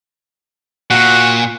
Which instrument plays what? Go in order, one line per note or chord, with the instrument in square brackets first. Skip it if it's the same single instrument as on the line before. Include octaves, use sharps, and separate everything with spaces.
[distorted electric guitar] A#2 [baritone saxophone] F#4